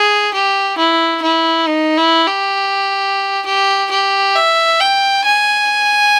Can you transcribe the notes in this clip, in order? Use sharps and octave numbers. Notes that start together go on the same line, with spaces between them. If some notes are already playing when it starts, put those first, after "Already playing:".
Already playing: G#4
G4
E4
E4
D#4
E4
G4
G4
G4
E5
G5
G#5